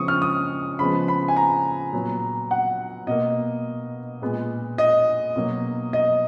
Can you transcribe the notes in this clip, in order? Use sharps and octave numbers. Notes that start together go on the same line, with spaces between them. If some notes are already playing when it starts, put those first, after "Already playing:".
Already playing: C#3 F3 G#3 B3 C#6 D#6
F6
D#6
C#3 F3 G#3 B3 B5
B5
G#5
A#5
A#2 F#3 B3
F#5
B2 A#3 D#5
A#2 G#3 B3
D#5
B2 F#3 A#3
D#5